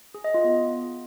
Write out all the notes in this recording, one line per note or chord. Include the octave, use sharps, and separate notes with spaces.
G#4
D#5
F4
B3